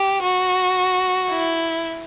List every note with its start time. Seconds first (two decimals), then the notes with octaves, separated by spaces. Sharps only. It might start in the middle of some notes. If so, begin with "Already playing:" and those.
Already playing: G4
0.23 F#4
1.30 E4